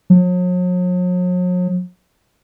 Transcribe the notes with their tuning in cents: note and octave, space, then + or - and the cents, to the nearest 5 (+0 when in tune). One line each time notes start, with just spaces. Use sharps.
F#3 -45